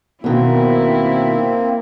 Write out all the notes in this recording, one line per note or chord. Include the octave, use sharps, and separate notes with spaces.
B2 D#3 A#3 C4 E4